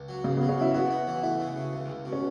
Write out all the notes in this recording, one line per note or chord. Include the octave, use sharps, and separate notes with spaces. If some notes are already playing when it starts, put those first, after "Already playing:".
Already playing: C#2
F#3
A1 C#3
B3
F#3
C#4
F#3 E4
B3 F#4
B3
E3
A3 E4
C#3
C#3
C#2
C#2
B2
C#4